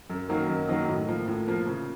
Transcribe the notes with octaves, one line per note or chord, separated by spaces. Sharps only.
F#2
D#3 F#3 A#3 D#4
F#2
D#3 F#3 A#3 D#4
A2
F3 A#3
A2
F3 A#3
C#3